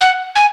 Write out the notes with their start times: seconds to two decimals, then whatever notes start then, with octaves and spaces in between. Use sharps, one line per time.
0.01 F#5
0.36 G#5